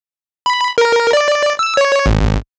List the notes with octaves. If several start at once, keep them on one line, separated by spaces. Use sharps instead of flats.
B5
A#4
D5
E6
C#5
G#1